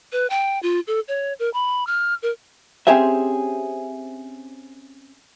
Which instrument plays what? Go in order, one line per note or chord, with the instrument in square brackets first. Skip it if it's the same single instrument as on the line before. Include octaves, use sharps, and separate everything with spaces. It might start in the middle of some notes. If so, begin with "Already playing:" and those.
[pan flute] B4
G5
F4
A4
C#5
A#4
B5
F6
A#4
[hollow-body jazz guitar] C4 C#4 G4 G#4 C5 E5